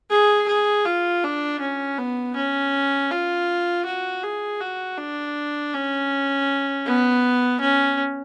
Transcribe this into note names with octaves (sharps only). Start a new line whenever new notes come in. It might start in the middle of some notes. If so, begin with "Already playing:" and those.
G#4
G#4
F4
D4
C#4
B3
C#4
F4
F#4
G#4
F#4
D4
C#4
B3
C#4